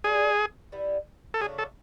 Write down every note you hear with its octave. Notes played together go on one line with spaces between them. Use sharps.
G3 B3 E4 G#4
G3 B3 E4
A4
C#3 F#3 A3 D4 G#4
A4